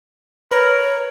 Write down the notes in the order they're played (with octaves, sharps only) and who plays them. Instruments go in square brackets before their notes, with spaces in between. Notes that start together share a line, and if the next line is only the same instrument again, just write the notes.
[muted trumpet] A#4 [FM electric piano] B4 [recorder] C#5